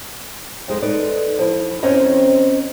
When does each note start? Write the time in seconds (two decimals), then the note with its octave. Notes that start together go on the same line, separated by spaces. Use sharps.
0.68 F2 G#3 D#4
0.82 D#4 A4 B4 D5
1.39 F3 E4
1.83 F2 C4 C#4 C#5 D#5 A#5